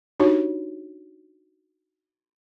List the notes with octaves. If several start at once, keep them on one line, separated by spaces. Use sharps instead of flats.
D4 D#4 F#4 G4 C#5